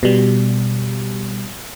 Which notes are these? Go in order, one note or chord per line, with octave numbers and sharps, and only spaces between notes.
B2 G3